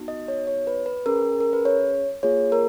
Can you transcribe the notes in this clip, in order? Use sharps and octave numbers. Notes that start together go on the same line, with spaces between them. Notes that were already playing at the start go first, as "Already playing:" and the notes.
Already playing: B3 D#4 F#4
D#5
C#5
C#5
B4
B4
C#4 G#4 A#4
A#4
B4
C#5
A#3 F4 G#4 C#5
A#4